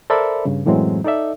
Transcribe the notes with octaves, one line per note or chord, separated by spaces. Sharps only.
A4 A#4 C5 D5 E5 B5
G2 C#3
F#2 A2 E3 F#3 G#3 C4
D#4 A4 D5 E5